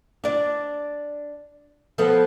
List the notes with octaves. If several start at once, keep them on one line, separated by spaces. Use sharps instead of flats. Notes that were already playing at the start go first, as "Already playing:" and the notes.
D4 D5
F3 B3 A4